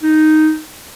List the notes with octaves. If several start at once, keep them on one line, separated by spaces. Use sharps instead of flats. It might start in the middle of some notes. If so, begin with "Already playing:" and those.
D#4